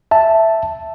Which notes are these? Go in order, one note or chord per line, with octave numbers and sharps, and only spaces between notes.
E5 A5